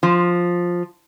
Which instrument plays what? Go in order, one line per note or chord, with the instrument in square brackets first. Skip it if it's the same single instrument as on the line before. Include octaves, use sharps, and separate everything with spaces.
[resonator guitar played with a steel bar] F3